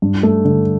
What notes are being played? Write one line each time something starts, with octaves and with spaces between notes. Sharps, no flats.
G2
A3
D3